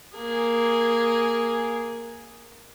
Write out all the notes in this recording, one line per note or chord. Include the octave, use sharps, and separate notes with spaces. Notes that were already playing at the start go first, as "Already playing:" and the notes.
A#3 G#4